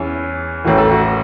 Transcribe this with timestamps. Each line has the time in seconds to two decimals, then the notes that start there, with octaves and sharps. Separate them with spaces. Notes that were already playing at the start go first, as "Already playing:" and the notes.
Already playing: E2 E3 C#4
0.64 A1 A2 E3 F#4
0.78 A4
0.91 F#4